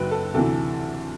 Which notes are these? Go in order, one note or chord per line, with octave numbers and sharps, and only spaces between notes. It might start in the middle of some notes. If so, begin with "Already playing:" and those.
Already playing: F#1 F#2 F#3 B4 G5
A4
D2 C3 E3 A4